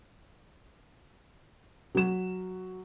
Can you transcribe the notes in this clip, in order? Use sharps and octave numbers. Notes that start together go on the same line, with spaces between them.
F#3 E7